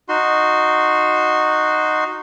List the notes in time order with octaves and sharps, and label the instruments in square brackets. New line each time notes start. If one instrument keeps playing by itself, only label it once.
[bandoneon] D#4 F#4 C6